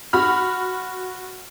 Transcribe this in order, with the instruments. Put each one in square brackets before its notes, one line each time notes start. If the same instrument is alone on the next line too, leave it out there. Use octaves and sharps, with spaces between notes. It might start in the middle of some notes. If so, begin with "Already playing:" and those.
[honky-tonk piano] F#4 B5 F6